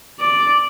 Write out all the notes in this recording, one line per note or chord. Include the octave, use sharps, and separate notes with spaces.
D5